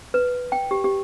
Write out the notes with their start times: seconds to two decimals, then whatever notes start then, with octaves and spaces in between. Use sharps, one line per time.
0.14 B4
0.52 G5
0.71 G4
0.84 G4